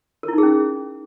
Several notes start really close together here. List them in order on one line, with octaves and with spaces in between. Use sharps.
A#4 E4 D#4 G#4 C#4